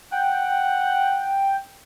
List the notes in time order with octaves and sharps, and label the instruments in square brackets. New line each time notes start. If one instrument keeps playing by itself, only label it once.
[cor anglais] F#5 [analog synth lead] G5